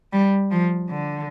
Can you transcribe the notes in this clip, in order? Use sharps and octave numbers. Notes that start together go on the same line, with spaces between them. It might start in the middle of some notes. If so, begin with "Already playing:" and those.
G3
F3
D3